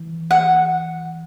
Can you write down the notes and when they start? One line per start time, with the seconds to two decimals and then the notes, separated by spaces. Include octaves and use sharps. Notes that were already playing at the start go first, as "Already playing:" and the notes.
Already playing: E3
0.31 F#5